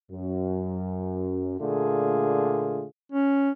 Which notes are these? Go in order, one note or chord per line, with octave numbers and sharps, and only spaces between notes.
F#2
A#2 D3 A3 A#3 F4 G#4
C#4